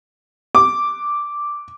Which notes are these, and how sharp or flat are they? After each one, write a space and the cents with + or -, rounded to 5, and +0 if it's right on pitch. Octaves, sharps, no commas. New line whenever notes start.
D6 -5